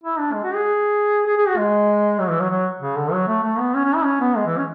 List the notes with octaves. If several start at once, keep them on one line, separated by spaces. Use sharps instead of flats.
E4
D4
G#3
F#4
G#4
G#4
G#4
F#4
G#3
F#3
E3
F#3
F#3
C#3
D3
F#3
A3
A3
B3
C#4
C#4
E4
C#4
B3
G#3
E3
C#4